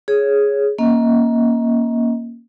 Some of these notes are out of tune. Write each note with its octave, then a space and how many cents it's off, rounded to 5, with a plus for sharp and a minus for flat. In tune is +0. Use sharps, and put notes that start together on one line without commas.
G#4 +0 C#5 +0
A#3 +10 C#4 -5 D#5 +35